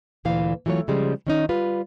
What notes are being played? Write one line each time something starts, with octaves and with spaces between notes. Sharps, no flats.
D2 A#2 E3 F5
E3 F#3 A3 F4 C#5
C#3 F3 G3 G#3
D#3 C#4 D#4
G3 F4 B4